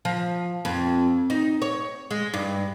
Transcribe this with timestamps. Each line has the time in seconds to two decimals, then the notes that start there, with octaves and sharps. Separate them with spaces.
0.05 F3
0.65 F2
1.30 D#4
1.62 C#5
2.11 G#3
2.34 G2